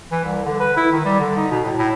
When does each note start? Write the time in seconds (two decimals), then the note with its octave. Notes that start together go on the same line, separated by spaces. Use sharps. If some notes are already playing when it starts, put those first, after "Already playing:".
0.11 E3
0.25 C2
0.45 D3
0.60 B4
0.77 E4
0.92 D#3
1.05 G3
1.20 D3
1.37 D#4
1.51 B2
1.64 A2
1.78 A2